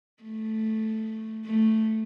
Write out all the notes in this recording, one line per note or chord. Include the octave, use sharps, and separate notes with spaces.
A3
A3